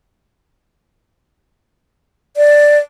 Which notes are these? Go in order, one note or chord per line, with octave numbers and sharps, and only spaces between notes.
D5